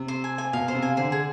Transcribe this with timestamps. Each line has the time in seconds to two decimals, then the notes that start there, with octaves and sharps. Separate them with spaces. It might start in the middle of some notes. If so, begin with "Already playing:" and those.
Already playing: C3
0.08 C5
0.24 G#5
0.38 G#5
0.53 B2 F5
0.68 C5
0.75 C3
0.82 G#5
0.97 D3 C5
1.12 G#4